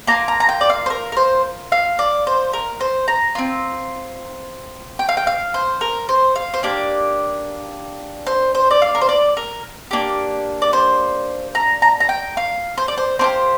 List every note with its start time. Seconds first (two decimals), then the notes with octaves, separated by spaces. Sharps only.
0.07 A#3 F4 A#5
0.28 A#5
0.40 A#5
0.49 G5
0.61 D5
0.70 F5
0.86 C5
0.90 A#4
1.12 A#4
1.17 C5
1.72 F5
1.99 D5
2.27 C5
2.53 A#4
2.80 C5
3.08 A#5
3.35 C4 F4
4.99 G5
5.09 F5
5.17 G5
5.27 F5
5.54 C5
5.81 A#4
6.09 C5
6.36 F5
6.54 C5
6.63 A#3 D4 G4 D5
8.26 C5
8.55 C5
8.71 D5
8.82 F5
8.95 A#4
9.01 C5
9.09 D5
9.37 A#4
9.91 A#3 D4 G4
10.62 D5
10.73 C5
11.55 A#5
11.82 A#5
12.00 A#5
12.09 G5
12.37 F5
12.77 C5
12.88 D5
12.98 C5
13.19 A#3 D4 C5
13.24 G4